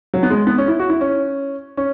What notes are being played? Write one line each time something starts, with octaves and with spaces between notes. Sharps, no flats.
F#3
B3
G#3
B3
C#4
E4
F#4
E4
C#4
C#4